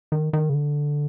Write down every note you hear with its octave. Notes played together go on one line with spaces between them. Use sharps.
D#3
D#3
C#3
D3